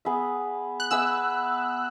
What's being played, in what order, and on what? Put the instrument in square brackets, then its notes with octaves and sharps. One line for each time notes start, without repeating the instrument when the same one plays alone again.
[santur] B3 G#4 B4 E5
[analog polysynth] F#6
[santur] B3 G#4 B4 E5 [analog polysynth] E6